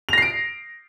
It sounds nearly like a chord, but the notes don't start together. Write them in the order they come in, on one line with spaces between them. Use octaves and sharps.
F7 A#6 C7 D7